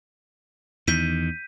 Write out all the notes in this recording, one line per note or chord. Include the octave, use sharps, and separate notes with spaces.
E2 D#3 G6 B6 D#7